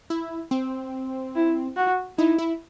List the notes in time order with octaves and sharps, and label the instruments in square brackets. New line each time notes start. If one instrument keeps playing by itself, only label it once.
[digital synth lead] E4
C4
[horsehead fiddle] E4
F#4
[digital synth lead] D#4 [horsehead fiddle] E4
[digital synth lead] E4